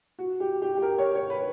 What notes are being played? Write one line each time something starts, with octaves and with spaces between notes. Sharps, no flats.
F#4
G4
G4
G4
A#4
C#5
C#5
B4